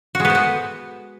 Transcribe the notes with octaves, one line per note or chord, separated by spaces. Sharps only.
F#4
G#3
B3
C5
B3